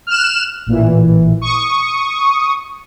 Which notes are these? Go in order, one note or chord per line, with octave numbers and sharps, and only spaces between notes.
F6 F#6 E7
A1 A#2 E3
C#6 D#6